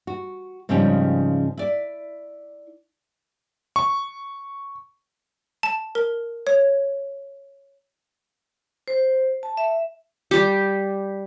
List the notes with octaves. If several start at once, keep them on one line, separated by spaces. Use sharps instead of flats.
F#4
G#2 C#3 F3 G3 C4 C#4
E4 D5
C#6
A5
A#4
C#5
C5
A5
E5
G3 G4